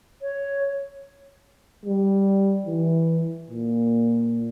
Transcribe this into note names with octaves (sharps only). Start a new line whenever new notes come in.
C#5
G3
E3
A#2